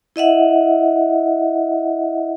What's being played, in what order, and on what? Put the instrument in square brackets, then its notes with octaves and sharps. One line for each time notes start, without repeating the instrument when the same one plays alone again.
[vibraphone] E4 D#5 E5 F#5